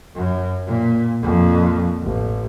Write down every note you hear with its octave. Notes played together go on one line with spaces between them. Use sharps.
F#2
A#2
F2 A#2
A1